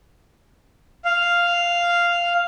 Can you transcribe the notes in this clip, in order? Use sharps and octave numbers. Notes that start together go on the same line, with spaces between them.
F5